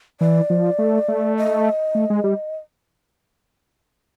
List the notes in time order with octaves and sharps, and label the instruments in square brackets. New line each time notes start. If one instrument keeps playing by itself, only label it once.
[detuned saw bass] E3 [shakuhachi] D5
[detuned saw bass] F3
A3
A3
[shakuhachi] D#5
[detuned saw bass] A3
G#3
G3